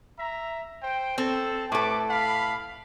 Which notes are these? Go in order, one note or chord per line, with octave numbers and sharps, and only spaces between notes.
E5 A#5
C5 G5
C4 A4
A2 A4 B4 D6
F5 B5